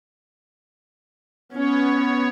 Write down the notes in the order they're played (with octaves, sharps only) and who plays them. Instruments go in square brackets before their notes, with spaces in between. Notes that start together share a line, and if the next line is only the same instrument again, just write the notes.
[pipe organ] B3 C#5 [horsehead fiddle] C#4